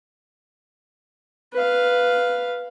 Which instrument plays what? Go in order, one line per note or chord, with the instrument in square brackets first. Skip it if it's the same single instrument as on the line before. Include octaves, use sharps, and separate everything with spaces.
[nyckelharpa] B4 F5